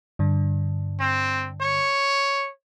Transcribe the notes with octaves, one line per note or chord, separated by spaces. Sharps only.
G2 D3
C4
C#5